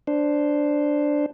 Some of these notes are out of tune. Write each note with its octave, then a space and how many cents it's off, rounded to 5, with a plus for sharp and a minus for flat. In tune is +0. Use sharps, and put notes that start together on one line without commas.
D4 +0 C5 +0